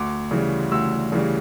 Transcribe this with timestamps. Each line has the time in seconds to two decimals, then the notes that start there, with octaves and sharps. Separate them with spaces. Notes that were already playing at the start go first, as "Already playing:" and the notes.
Already playing: D2 D6
0.31 C#3 E3 G3
0.72 D2 E6
1.12 C#3 E3 G3